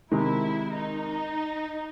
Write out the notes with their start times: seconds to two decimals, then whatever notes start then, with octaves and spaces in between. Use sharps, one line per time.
0.11 C3 D#3 G#3 E4
0.75 D#4